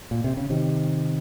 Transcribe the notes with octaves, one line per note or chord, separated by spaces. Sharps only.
A#2
C3
C#3
C3 D#3